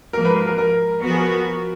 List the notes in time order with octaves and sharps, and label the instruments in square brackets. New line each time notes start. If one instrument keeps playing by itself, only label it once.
[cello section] G#2 F3 A#3 [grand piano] A#4
[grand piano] B4
A#4
A#4
A#4
[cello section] F3 B3 F#4 [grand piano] A#4
[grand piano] G#4
A#4